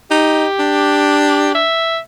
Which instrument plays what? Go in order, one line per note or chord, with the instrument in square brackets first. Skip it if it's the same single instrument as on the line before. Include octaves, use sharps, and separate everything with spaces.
[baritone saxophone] D#4 [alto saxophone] G4
[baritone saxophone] D4
[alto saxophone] E5